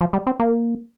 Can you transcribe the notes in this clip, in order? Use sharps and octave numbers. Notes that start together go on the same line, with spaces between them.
F3
G3
C4
A#3